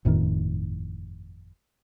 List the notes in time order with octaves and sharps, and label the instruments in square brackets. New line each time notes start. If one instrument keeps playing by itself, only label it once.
[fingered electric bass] G1 F2 A2 D#3